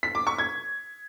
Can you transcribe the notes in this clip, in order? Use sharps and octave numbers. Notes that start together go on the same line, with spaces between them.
B6
D6
C#6
G#6